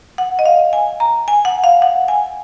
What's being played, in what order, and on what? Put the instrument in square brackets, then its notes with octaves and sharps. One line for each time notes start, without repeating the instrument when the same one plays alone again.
[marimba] F#5
D#5
F5
G#5
A#5
G#5
F#5
F5
F#5
G#5